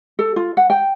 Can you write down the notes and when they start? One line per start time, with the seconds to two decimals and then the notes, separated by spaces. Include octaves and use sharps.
0.19 A4
0.36 F4
0.57 F#5
0.70 G5